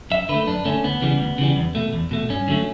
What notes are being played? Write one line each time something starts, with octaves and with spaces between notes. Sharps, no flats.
F#2 E5
D3 A3 B4
F#2 D4
D3 A3 C#4
D2 B3
C#3 E3 G3
D2
C#3 E3 G3
E2
B2 A3
E2
B2 A3
G2 C#4
D3 F#3 A3